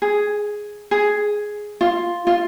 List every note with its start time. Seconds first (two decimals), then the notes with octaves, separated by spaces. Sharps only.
0.02 G#4
0.91 G#4
1.81 F4
2.27 F4